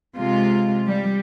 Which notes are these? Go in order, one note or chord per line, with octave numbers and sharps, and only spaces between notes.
C3 G#3 F4
G3